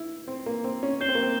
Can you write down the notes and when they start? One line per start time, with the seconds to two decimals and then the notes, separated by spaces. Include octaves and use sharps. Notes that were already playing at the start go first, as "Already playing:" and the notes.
Already playing: E4
0.28 C4
0.46 A#3
0.64 C4
0.83 C#4
1.01 C#4 G6 C7 E7 G7
1.09 C4
1.15 A#3
1.23 C4